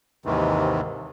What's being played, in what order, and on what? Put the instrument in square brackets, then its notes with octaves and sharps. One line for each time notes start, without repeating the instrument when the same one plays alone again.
[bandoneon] D#2 G#2 C3 D#3 E3